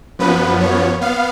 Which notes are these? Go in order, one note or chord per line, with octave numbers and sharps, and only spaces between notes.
F#2 F3 B3 B4
C#5
B3 F5